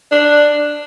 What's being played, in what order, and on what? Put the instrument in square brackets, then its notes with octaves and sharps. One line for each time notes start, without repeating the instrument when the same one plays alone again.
[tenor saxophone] D4